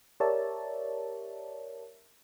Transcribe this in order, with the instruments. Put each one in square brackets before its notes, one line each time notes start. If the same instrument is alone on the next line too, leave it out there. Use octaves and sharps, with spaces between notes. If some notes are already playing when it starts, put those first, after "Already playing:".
[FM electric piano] G4 A#4 C#5 D5 E5 A5